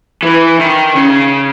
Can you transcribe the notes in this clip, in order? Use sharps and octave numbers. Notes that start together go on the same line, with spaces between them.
E3
D#3
C#3